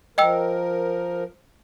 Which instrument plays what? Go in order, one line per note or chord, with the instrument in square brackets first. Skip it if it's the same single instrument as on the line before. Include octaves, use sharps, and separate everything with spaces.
[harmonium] F3 A#4 [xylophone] D#5 G5 E6